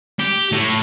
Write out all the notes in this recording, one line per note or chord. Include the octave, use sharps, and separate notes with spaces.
G4
A2